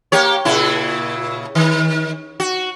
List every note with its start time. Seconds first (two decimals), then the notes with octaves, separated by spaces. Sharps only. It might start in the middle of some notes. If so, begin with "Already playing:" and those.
0.12 A#3 G4 C#5
0.45 A#2 C#3 E4
1.55 D#3
2.40 F#4